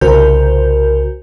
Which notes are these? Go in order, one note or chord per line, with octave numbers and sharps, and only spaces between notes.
C2 C#3 F#4 A#4 C5 G6